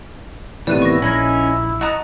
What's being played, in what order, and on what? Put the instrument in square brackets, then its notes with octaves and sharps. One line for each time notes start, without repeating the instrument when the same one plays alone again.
[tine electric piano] A2 C3 D#3 [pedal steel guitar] E3 B3 [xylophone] D5 F#6 D#7
[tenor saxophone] E4 [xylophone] C#6 A#6
[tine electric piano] A#1 [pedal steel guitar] C#4 D#4 A#4 [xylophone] B5 G#6 A#6
[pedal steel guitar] F#4 A5 D#6 [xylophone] D#5 A#5 F#6